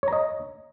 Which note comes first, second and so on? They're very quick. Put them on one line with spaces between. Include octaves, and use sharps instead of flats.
C#5 A#5 D#5